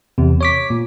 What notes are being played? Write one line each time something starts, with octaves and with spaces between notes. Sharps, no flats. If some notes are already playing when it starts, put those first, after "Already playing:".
E2 C3
C#5 D6 B6
A#2